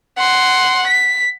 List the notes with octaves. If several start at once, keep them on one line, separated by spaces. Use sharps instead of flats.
F#5 C6
B6